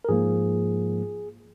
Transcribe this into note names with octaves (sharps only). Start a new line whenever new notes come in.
A#4
G#2 F3 A#3 G#4